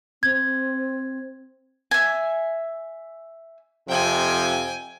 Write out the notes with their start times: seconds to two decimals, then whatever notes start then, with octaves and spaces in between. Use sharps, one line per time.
0.23 C4 G#6
1.91 E5 G#5
3.89 F2 C3 F3 G5 G#5